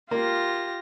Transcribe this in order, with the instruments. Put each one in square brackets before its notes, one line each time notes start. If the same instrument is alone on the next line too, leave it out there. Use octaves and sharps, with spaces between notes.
[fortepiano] A#3 [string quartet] F4 G4 A#6